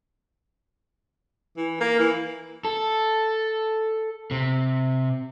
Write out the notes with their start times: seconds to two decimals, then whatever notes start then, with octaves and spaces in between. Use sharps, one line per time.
1.57 E3
1.81 A#3
1.99 E3
2.65 A4
4.31 C3